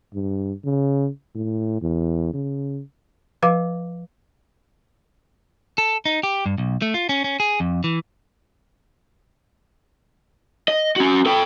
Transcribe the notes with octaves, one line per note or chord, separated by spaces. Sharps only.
G2
C#3
A2
E2
C#3
F3 B4 F5 D6
A4
D#4
G4
G2
B1
A3
F4
C#4
C#4
G#4
F2
E3
D#5
C#4 F#4
A4 G5